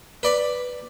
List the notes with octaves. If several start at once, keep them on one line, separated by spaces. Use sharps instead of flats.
B4 D5 B5